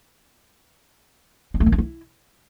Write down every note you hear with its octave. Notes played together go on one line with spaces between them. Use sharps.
C4
A3
D#3
C#4
E4